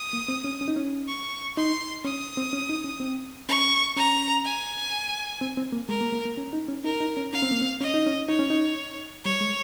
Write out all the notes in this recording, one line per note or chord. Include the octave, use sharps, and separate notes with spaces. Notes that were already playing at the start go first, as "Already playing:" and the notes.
Already playing: D#6
A#3
C4
C#4
C#4
D#4
C#4
C#6
D#4 C6
C#4 D#6
C4
C#4
D#4
C#4
C4
C#4 C#6
C#4 A#5
G#5
C4
C4
A#3
G#3 A#4
A#3
A#3
A#3
C#4
D#4
C#4
D#4 A#4
D#4
C#4
C#4 F5
C4
A#3
C4
C#4 D#5
D#4
C#4
D#4 C#5
C#4
D#4
G3 C#5
G#3